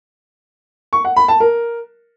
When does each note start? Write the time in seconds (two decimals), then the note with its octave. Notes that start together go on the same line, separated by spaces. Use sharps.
0.93 C#6
1.05 F#5
1.16 B5
1.28 A5
1.40 A#4